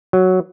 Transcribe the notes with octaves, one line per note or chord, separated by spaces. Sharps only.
F#3